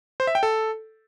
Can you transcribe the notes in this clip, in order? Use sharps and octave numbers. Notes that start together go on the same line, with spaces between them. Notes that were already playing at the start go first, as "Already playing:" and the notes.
C5
E5
G5
A4